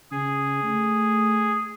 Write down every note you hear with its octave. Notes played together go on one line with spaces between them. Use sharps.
C#3 G#4
A3